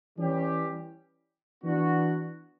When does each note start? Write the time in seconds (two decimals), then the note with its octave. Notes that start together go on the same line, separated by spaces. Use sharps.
0.18 E3 G3 C#4 G4
1.64 E3 B3 D4 F#4